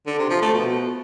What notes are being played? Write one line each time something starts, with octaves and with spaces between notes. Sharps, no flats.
D3
C3
F3
A3
B2